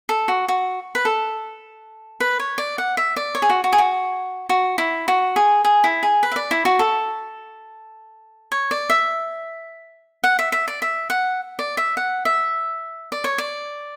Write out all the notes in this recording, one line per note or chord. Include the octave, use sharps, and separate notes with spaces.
A4
F#4
F#4
B4
A4
B4
C#5
D5
F#5
E5
D5
C#5
G#4
F#4
F#4
G#4
F#4
F#4
E4
F#4
G#4
G#4
E4
G#4
B4
E5
D5
E4
F#4
A4
C#5
D5
E5
F#5
E5
E5
D5
E5
F#5
D5
E5
F#5
E5
D5
C#5
D5